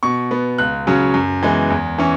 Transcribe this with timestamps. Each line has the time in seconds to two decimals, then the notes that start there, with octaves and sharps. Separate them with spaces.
0.03 B2 C#6
0.31 B3
0.58 C#2 F#6
0.87 C#3 F#3 C#4
1.14 F#2
1.43 E3 G#3 B3
1.70 E2
1.98 E3 C#4